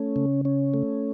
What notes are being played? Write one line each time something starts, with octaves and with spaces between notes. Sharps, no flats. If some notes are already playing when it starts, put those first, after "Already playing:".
Already playing: A3 C#4
C#3
C#4
A3